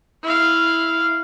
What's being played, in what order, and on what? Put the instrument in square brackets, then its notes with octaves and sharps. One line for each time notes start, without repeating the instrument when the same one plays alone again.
[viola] E4 F5